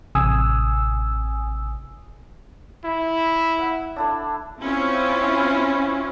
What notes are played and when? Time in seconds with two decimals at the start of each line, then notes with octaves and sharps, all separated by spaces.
0.15 A1 C3 G#5 D#6 E6
2.85 E4
3.58 E5 F#5
3.96 D4 E4 A4
4.61 C4 C#4 E4 F4